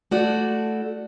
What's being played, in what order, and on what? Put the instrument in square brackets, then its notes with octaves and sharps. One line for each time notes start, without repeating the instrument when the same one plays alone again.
[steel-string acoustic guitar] A3 E4 F#4 A4 D5